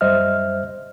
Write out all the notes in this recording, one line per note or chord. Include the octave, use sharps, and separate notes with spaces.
F#2 G3 C5 D#5 E5 F6